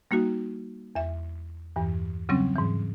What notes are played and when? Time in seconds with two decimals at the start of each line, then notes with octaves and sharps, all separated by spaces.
0.11 G3 A#3 D#4 F#4
0.95 E2 E5
1.76 E2 G2 E3
2.29 C#3 F#3 G3 C4 C#4
2.56 G#2 E3